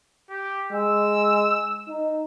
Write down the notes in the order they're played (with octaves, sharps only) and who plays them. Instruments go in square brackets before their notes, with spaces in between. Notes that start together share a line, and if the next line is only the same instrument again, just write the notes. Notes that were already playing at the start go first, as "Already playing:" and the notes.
[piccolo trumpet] G4
[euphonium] G#3 [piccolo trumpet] E6
[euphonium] D#4